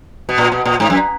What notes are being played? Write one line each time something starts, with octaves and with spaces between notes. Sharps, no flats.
B2
A#2
B2
A#2
G#2
F#2